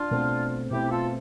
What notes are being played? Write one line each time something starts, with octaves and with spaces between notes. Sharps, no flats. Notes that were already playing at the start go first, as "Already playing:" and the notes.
Already playing: D4 F4
B2 A3 C4
B2 A3 C4 E4 G4
F4 A4